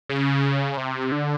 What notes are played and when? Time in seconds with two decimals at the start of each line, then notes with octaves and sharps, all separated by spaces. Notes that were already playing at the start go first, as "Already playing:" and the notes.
0.10 C#3
0.77 C3
1.12 D3